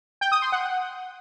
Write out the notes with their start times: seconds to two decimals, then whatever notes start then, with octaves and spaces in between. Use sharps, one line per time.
0.21 G5
0.32 D#6
0.42 C6
0.52 F#5